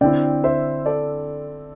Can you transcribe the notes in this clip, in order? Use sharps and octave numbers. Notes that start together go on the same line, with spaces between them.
D3 C4 E4 D5 G5
C5 E5
A4 D5